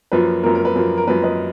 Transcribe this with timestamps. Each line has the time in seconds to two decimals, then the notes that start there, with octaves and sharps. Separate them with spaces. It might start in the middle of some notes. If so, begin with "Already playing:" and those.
0.12 F#2 F3 A#3 B4
0.43 F#2 F3 A#3 A#4
0.55 A#4
0.65 B4
0.75 F#2 F3 A#3
0.97 A#4
1.07 F#2 F3 A#3 B4
1.23 B4 D#5